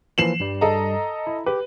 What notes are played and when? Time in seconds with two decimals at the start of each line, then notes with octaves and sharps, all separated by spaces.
0.18 E3 F3 A#3 C7 E7 F#7
0.40 G2 G3
0.61 A4 D#5 A#5
1.27 E4
1.46 G4 B4